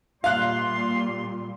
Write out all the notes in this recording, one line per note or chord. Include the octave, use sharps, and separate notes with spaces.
A#2 G3 F4 F5 C6 F#6